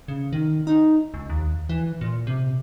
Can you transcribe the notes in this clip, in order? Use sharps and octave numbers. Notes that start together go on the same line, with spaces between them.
C#3
D#3
D#4
C#2
D#2
E3
A#2
C3